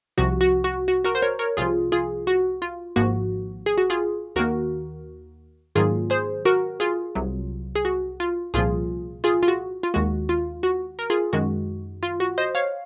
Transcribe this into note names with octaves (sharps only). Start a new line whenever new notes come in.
C2 C3 F3 F#4
F#4
F#4
F#4
F#4 A#4
C5
A#4 C#5
A#4 C#5
C2 C3 F3 F4 G#4
F4 G#4
F#4
F4
G#1 G#2 F3 A#3 F#4
G#4
F#4
F4 G#4
D#2 D#3 A#3 F#4 A#4
G#2 D#3 F#3 A#3 F4 G#4
G#4 C5
F#4 A#4
F4 G#4
C2 C3 F#3
G#4
F#4
F4
C2 A#2 F3 F4 G#4
F4 G#4
F4
F#4
F4
D#2 D#3 G#3 F#4
F4
F#4
A#4
F4 G#4
F#2 D#3 G#3 F#4
F4
F#4
C5 D#5
C#5 F5